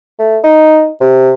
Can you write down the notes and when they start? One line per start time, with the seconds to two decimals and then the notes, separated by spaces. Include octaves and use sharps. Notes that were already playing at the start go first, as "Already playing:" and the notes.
0.19 A3
0.44 D#4
1.01 C3